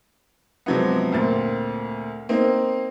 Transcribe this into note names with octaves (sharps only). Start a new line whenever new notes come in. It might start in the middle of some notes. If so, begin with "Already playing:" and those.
C3 F3 F#3 G#3 B3
D2 A#2 C4 A6
A#3 C4 D#4